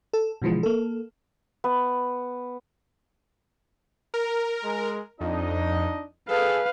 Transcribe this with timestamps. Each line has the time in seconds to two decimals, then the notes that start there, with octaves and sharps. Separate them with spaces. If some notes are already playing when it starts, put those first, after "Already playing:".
0.13 A4
0.42 B2 D3 E3 F3 G#3
0.63 A#3 A4
1.64 B3
4.14 A#4
4.63 G#3
5.21 F2 D4 D#4 D#5
6.29 G#4 A4 B4 F5